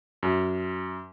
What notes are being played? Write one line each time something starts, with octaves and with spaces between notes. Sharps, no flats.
F#2